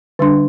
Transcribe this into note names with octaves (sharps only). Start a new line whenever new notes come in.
D3 G3 D4